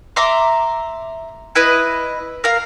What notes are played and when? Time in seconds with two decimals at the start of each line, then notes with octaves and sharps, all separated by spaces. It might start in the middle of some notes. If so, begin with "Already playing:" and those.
0.16 E5 A#5 C6 D6
1.55 E4 B4 D#5
2.44 A#4 F5